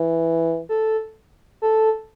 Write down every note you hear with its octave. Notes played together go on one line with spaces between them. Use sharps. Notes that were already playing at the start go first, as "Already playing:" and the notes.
Already playing: E3
A4
A4